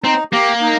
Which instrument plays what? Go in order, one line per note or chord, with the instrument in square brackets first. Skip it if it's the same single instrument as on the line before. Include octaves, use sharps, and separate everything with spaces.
[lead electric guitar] C4 [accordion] D#4
[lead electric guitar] A#3 [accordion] G4
[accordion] D#4